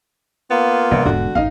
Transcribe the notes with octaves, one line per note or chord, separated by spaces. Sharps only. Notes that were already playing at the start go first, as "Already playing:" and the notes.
A#3 B3 F4
A#1 C3 G3
E1 G#2 D3 F#4
A1 F#2 D#4 D#5 F5